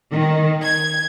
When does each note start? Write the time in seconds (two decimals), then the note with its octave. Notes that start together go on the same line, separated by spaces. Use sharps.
0.12 D#3
0.63 G#6